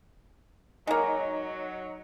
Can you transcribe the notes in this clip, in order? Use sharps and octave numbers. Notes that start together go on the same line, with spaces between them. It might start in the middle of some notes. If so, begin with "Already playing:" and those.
F#3 G#3 A#3 D#4